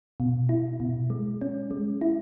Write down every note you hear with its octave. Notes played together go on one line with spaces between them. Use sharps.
B2
E4
B2
G#3
C#4
G#3
E4